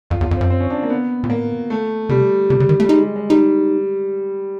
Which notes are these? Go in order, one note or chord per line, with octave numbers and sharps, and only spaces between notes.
F2 F4
E2
F4
F2
C4
F#2
C4
C#4
D4
A#3
B3
A#2
A2 A#3
A3
C3 G3
C3 G3
C#3
D#3
A3
G3
G#3 D#4
G3
G#3
G3 D#4